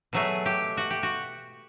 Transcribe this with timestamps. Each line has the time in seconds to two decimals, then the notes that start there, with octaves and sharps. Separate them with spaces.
0.13 B2 F#3 A3 G#4
0.46 G4
0.77 F#4
0.90 G4
1.03 F#4